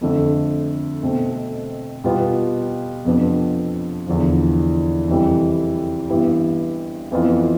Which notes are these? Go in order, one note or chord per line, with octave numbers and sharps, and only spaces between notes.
F2 D3 A3
B2 A3 C4
B2 G3 B3 F4
F2 C3 F3 B3 D4
E2 D3 F3
F2 C3 E3 G3
G2 E3 B3 E4 G4
F2 E3 B3 F4